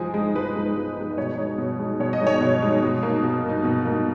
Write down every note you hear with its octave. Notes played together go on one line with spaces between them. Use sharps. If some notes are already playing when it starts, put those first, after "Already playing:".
Already playing: F3 G#3 D#4 G#4
G#3 D#4
F3 B4
G#3 D#4
F3
G#3 D#4
D#5
B2 C#5
G#3 D#4
B2
G#3 D#4
B2 C#5
D#5
G#3 D#4
C#5
B2
G#3 D#4
B2
A#3 D#4
B2
A#3
D#4
B2
A#3 D#4